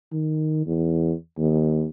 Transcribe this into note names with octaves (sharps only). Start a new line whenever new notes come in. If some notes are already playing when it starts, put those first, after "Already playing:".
D#3
E2
D#2